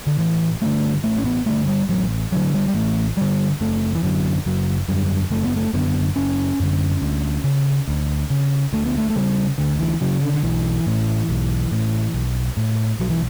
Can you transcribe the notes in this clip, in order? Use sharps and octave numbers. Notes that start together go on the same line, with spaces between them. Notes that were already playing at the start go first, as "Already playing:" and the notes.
D3
A1 E3
G2 D3 A3
A1 A3
C#4
B3
G2 D3 A3
G3
A1 F#3
G2 D3 F#3
G3
G3
A1 A3
G2 D3 G3
F#1 A3
E3
F#2 D3 F#3
F#1 F#3
F#2 D3 G3
F#1 A3
B3
A3
F#2 D3 B3
F#1 C#4
F#2 D3
D2
C#3
D2
C#3
D2 A3
B3
A3
A3
C#3 G3
D2 D3
E3
C#3 F#3
D3
D3
B1 E3
A2
B1
A2
B1
A2
B1 F#3
E3